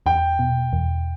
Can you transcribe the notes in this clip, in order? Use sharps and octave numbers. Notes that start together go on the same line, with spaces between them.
E2 G5
B2
E2